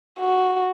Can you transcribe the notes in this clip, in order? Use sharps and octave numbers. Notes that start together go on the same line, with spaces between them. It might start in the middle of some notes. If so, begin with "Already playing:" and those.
F#4